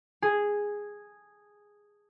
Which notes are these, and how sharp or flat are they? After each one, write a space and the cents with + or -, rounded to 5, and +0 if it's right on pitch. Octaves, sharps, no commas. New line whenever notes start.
G#4 -5